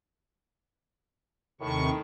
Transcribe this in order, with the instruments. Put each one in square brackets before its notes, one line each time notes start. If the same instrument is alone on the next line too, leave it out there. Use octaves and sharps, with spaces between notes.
[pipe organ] D#2 C3 C#6 [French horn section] A2 D#3